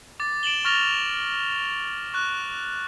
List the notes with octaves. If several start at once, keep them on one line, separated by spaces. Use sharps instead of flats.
D6 A6
D7 E7 F#7 G7
C#6 F6 A6 A#6 F7 G7
C#6 F#6